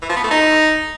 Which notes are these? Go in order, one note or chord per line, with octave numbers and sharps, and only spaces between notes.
E3
F3
B3
A3
D#4